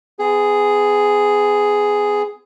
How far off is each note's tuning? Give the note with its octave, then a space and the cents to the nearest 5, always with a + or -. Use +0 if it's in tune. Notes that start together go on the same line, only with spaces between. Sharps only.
B3 +40 G#4 +0